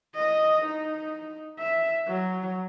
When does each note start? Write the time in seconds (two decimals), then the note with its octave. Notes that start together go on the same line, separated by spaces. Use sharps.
0.15 D#5
0.65 D#4
1.59 E5
2.08 F#3